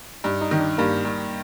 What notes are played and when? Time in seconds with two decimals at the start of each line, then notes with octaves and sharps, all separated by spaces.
0.24 G2 D#4
0.42 D#4
0.51 D#3
0.60 D4
0.78 G2 A#3
1.05 G2